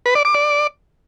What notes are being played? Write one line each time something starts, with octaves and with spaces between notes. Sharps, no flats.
B4
D5
D6
D5